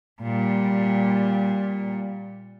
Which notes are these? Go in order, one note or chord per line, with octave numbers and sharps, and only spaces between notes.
A#2 G3